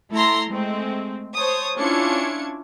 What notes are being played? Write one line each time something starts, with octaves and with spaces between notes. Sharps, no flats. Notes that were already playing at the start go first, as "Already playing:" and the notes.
A3 E4 A4 A#5 C6 A#6
G#3 A3 C4
C5 C#5 A5 D#6
C#4 D4 E4 F4 G#6 C#7